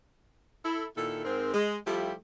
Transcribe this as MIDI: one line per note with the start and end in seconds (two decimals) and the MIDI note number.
0.65 0.86 64
0.65 0.86 69
0.97 1.22 46
0.97 1.22 51
0.97 1.22 64
0.97 1.22 69
1.25 1.51 44
1.25 1.51 60
1.25 1.51 70
1.54 1.77 56
1.87 2.14 53
1.87 2.14 55
1.87 2.14 57
1.87 2.14 64
1.87 2.14 65
1.87 2.14 67